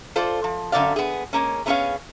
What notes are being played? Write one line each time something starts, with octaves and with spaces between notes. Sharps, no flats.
F4 A4 C5 D5
F3
F#2 D3 E3 A3 D5 F5
B3 G#4
G#3 A#3 C#4
A3 B3 C#4 G#4 C#5 F5